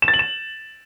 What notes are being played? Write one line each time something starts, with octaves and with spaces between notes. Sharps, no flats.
E7
A6
F#7
E7